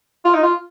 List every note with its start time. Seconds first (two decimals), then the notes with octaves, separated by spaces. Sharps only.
0.25 F4
0.34 D#4
0.43 F4